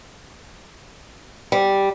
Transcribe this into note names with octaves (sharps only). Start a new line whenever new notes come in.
G3